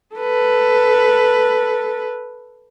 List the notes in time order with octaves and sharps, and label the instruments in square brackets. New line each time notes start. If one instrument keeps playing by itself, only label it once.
[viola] A4 B4